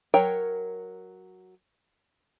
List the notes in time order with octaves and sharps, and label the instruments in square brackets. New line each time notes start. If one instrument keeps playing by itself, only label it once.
[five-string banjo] F#3 A#4 C#5 G5